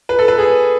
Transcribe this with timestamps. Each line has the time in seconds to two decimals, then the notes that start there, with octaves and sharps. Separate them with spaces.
0.09 B4
0.19 A4
0.28 B4
0.38 G#4